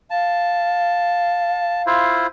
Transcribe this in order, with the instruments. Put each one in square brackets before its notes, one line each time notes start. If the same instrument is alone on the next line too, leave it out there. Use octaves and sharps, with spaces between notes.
[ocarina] F5 [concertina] A5
[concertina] E4 F4 C5